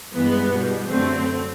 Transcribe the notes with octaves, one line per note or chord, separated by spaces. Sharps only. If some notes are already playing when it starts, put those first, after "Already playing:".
G2 E3 G#3 B3
B2 G3
F#2 D3 F#3 A3 C4